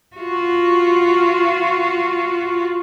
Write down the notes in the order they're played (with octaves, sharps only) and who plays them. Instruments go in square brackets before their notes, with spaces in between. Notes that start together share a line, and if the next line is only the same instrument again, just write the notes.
[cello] F4 F#4